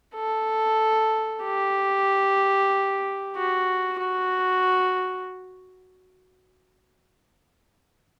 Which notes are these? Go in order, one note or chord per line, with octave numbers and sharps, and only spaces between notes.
A4
G4
F#4
F#4